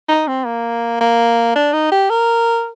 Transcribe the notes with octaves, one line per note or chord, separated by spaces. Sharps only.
D#4
C4
A#3
A#3
D4
D#4
G4
A#4